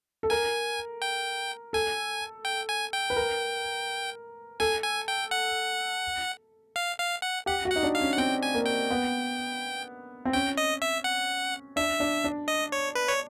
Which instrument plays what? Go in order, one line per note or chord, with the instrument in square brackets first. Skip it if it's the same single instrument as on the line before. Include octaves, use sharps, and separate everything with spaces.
[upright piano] A4
[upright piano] A#4 [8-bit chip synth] G#5
[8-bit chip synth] G5
[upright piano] A4 [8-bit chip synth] G#5
[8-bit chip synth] G5
G#5
G5
[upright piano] B4
A#4
[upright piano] A4 [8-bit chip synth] G#5
[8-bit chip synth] G#5
G5
F#5
F5
F5
F#5
[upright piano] G4 [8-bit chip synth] F#5
[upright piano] F#4
[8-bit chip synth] F#5
[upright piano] D#4
D4
[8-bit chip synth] F5
[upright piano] C#4
[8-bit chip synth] F#5
[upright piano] C4 [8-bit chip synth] G5
[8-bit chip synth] G#5
[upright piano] A#3
[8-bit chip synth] G5
[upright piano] B3
C4
[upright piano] C#4 [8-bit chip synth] G5
[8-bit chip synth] D#5
E5
F#5
[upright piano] D4 [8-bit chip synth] E5
[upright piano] D4
D4
[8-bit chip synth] D#5
C#5
B4
C#5